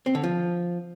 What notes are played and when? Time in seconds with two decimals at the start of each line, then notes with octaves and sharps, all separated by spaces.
0.06 C4
0.15 D3
0.23 F3